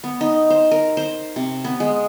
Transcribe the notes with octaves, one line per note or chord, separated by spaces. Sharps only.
B3
D#4
C5
A#4
C5
C3
B3
G#3